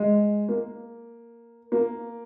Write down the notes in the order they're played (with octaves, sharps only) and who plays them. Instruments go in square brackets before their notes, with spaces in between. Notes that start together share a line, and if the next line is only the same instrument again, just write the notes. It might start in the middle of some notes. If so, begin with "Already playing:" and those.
Already playing: [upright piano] G#3
A#3
A#3